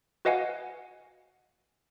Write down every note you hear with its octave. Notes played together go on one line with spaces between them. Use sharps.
F#4 B4 D#5 F5 F#5 G#5